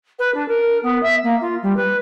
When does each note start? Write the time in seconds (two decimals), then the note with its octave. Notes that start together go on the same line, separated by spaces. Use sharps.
0.18 B4
0.34 D4
0.48 A#4
0.82 B3
1.02 E5
1.23 A#3
1.40 F4
1.62 G3
1.76 B4